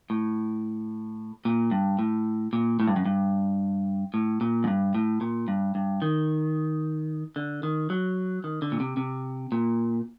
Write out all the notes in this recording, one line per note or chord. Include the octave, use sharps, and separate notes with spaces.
A2
A#2
G2
A2
A#2
A2
G2
F#2
G2
A2
A#2
F#2
G2
A2
A#2
G2
G2
D#3
D3
D#3
F#3
D#3
D3
A#2
C3
C3
A#2